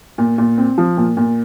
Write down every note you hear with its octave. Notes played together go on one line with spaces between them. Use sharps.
A#2
A#2
C4
F3
A#2
A#2